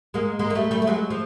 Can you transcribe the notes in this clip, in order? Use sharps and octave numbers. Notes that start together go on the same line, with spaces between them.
G#3 A#3
G#3 A#3
A#3
G3 A3
G3 A3
A3
F#3 G#3
F3